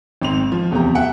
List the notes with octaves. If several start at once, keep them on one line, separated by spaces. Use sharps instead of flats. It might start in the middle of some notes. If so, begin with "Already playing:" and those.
G#1 C4 F7
F3
D1 E2 C3 G4 A#5
E5 F#5 G5